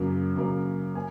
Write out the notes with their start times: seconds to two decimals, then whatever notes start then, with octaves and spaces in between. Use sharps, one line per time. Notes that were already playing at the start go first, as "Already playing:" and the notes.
Already playing: F#2 C#3 F#3 A#3
0.36 F#2 C#3 F#3 A#3
0.95 A#3 G#5